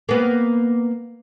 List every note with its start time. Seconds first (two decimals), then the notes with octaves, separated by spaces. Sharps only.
0.09 A#3 B3